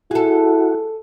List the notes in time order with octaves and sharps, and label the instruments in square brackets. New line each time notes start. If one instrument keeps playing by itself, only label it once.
[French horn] E4 [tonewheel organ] F#4 [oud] G#4 A4